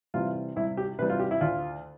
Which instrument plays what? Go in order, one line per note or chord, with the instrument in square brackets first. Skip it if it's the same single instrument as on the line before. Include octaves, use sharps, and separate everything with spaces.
[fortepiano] C3 E3 G3 F4
C2 E4
G4
C3 E3 G3 B4
F4
G4
E4
D2 F4